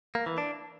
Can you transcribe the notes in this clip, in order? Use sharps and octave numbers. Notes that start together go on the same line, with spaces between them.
A#3
E3
D4